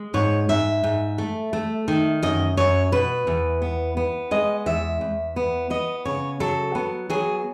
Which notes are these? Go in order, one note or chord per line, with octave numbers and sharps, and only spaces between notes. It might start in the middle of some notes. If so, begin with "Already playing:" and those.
Already playing: G#3
G#2 C#5
G#2 E5
G#2
A3
A3
D#3
F#2 D#5
F#2 C#5
B2 B4
E2
B3
B3
G#3 D#5
E2 E5
E2
B3
B3 D#5
C#3 C#5
F#3 A4
B3
F#3 G#4